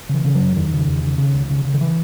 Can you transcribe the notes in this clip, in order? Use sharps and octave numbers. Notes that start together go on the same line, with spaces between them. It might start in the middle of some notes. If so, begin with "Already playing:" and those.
C#3 E3
C#3
F#3
F#2
E2 D#3
C#3
E2
C#3
C#3
C#2
C#3
C#3
D#3
E3